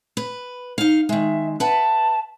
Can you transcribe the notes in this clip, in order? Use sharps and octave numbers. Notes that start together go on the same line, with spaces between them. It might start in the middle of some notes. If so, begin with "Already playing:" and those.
B4
D#4 F5
D#3 G#3 E5
B4 E5 F#5 A5